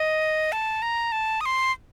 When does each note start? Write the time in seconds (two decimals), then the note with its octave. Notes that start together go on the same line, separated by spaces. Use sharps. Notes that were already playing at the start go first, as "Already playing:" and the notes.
Already playing: D#5
0.52 A5
0.82 A#5
1.12 A5
1.41 D#6
1.45 C6